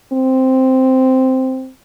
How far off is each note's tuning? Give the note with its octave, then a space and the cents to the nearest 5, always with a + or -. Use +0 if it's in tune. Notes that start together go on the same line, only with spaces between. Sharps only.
C4 -5